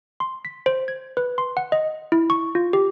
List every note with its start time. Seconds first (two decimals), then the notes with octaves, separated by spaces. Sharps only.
0.20 C6
0.45 B6
0.66 C5
0.88 G#6
1.17 B4
1.38 C6
1.57 F#5
1.72 D#5
2.12 E4
2.30 C#6
2.55 F4
2.73 G4